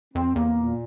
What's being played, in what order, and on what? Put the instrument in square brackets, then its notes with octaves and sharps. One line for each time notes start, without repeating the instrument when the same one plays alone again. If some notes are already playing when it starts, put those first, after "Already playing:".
[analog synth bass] F2 [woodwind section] C4
[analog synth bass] E2 [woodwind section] A#3
[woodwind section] A#2